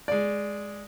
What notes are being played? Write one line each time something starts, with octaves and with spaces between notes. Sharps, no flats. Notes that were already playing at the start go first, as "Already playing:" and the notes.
G#3 D5